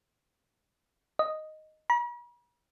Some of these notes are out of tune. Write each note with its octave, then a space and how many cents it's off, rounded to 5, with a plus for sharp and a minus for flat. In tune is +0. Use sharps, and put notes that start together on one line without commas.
D#5 +0
B5 -45